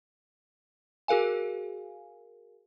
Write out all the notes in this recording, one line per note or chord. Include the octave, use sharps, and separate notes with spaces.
F#4 G#4 A#4 F5 G#5